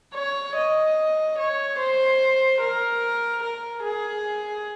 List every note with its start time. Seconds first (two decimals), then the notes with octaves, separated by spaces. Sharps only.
0.14 C#5
0.56 D#5
1.38 C#5
1.79 C5
2.61 A#4
3.42 A#4
3.83 G#4